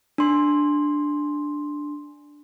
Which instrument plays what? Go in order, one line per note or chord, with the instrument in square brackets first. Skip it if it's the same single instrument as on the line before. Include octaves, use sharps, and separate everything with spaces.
[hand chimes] D4 C6